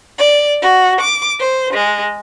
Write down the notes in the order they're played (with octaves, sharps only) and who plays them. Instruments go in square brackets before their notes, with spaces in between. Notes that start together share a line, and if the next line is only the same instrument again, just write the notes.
[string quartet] D5
F#4
D6
C5
G#3